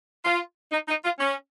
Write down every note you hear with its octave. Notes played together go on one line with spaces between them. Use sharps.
F4
D#4
D#4
F4
C#4